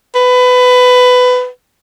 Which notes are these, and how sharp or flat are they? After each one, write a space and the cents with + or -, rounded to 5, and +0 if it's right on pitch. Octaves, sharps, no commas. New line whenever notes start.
B4 +20